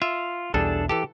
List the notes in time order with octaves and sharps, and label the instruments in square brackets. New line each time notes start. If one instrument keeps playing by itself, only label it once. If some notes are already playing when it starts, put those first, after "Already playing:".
[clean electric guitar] F4 [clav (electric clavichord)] E5
[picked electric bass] B1 E2 [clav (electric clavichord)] G3 G#4 [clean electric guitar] D4 A4
[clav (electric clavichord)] E3 A4 A5 [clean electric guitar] G4